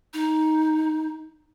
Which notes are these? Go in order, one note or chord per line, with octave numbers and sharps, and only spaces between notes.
D#4